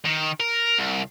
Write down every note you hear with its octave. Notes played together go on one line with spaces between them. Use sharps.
D#3
A#4
C2